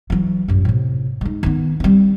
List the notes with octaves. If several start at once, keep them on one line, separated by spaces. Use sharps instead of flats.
E3 F#3
A1 F#2
A2 C3
G#3 D#4
D#3 B3
G3 C4